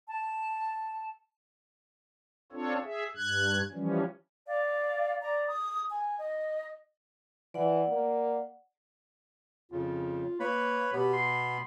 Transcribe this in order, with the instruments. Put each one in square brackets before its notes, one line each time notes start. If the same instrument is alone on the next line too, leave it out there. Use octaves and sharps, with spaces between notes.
[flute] A5
[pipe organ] C4 D4 F4 A4 C#5
G#4 E5
G2 F#6 G#6
E3 F3 G3 C#4
[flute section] D5 F5
D5 A#5
D#6
G#5
D#5
[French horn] E3 [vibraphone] D5 F#5
[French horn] A#3
[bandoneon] F2 C#3 [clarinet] F4
[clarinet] A#3 [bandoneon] B4 C#5 B5
[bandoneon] B2 B3 B5 [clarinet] G4
[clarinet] C6